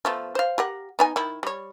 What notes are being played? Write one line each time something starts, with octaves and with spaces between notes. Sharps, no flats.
F3 A3 B3
C5 F5
G4 A#4 F#5
B3 D#4 G#5
D#3 E4
G3 C#5